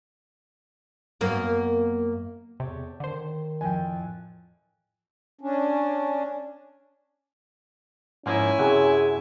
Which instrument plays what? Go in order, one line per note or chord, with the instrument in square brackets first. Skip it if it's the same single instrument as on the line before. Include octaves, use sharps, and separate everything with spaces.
[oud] F#2 A#3 B3
[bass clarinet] E2 [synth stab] C3 [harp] G4 A4 C#5
[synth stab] D3 C5 [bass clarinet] D#3
[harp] F2 A2 F3 [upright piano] G5 G#5
[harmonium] C#4 D4
[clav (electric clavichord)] G#2 F3 A#3 [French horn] C#4 [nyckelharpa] E4 G#5
[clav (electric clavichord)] F#2 C3 F#3 [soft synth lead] G#4